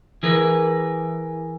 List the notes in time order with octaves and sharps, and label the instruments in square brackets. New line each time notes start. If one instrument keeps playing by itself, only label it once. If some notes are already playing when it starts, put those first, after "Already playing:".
[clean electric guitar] E3 G#4 A#4 B4